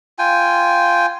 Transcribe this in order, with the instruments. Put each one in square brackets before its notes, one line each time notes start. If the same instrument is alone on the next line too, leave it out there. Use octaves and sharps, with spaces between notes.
[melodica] F4 G5 G#5